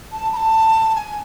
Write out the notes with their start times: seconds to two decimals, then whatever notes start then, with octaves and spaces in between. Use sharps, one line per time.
0.12 A5
0.33 B5
0.37 A5
0.95 G#5